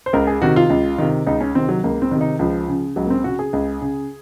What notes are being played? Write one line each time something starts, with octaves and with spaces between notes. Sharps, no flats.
C5
C#2 A#4
G#4
C3 D#3 F#4
F4
C#2
C3 D#3
C#2 D#4
C#4
C3 D#3 C4
F#3
C#2 A#3
C4
C3 D#3
D#4
C#2 F3
C#3
C#2 F#3
A#3
C4
C#3 F#4
G#4
C#2
C#3